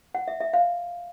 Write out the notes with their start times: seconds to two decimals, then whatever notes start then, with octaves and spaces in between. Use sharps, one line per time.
0.15 F#5
0.28 E5
0.41 E5
0.53 F5